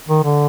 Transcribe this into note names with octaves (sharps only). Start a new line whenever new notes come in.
D#3
D3